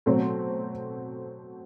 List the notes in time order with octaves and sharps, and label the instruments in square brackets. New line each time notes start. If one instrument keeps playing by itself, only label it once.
[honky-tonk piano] B2 F#3 A3 C4